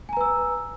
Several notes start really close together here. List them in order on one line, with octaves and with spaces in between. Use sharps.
G#5 A#5 B4 E6